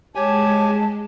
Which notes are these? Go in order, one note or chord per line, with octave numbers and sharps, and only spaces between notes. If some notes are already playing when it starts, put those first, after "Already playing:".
G#3 G4 C#5 G#5 A5